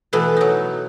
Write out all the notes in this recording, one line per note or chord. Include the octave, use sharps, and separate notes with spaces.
B2 E3 A3 B3
F#3 D#4